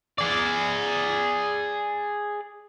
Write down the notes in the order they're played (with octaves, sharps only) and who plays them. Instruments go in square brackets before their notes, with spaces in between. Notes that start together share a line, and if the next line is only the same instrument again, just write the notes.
[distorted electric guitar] G#4 D5